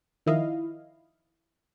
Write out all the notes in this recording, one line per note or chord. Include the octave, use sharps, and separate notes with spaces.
D#3 F3 E4 D#5 F5